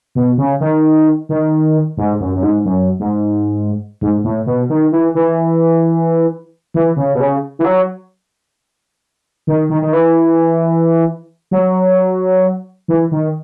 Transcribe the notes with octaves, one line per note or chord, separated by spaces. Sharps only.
B2
C#3
D#3
D#3
G#2
F#2
F#2
G#2
F#2
G#2
G#2
A2
B2
D#3
E3
E3
E3
C#3
B2
C#3
E3
F#3
D#3
D#3
D#3
E3
F#3
E3
D#3